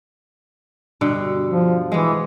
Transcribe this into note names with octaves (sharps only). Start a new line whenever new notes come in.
G2 B2 D3
F3
E3 G#3 B3